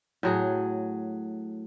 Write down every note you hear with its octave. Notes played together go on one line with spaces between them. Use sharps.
A2 F#3 G#4